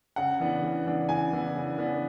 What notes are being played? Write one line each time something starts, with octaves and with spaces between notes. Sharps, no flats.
C#3 F#5
E3 B3 D4
C#3
E3 B3 D4
C#3 G#5
E3 B3 D4
C#3
E3 B3 D4